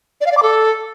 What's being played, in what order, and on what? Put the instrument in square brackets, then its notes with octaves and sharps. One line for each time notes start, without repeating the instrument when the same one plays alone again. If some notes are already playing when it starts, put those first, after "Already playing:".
[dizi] D5
F5
D5
D6
A4